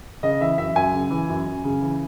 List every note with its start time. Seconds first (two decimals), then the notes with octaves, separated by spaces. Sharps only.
0.23 C#3 D#5
0.41 E3 E5
0.58 F#2 E5
0.75 F#2 G#5
0.94 C#3
1.11 E3
1.29 F#2
1.46 F#2
1.64 C#3
1.81 E3